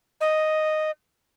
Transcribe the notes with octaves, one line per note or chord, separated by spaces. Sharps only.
D#5